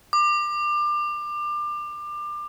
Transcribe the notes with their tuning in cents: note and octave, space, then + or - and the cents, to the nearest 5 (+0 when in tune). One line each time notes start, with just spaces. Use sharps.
D6 +25